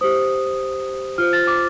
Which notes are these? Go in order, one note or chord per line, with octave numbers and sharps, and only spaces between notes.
G4 C5 D#6
F4 C5 F6
A6
D6